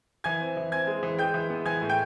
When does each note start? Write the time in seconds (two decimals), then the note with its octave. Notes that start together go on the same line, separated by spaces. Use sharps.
0.24 E3 G#5 G#6
0.40 C4
0.57 E3
0.72 C4 G#5 G#6
0.87 G#3
1.03 E3
1.18 G#3 G5 G6
1.34 E3
1.50 B3
1.66 E3 G#5 G#6
1.82 A2
1.89 G5 G6